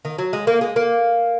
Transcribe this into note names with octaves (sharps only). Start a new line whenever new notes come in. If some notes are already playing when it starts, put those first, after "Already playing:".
D#3
F#3
G#3
A#3
G#3
A#3